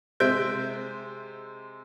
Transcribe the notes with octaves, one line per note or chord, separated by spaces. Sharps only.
C3 G#3 C5 E5 G6 D7